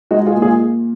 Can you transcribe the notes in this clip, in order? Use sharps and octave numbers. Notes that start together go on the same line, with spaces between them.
G#3 D#4 F#4
F4 G#4
A#2
F4 G#4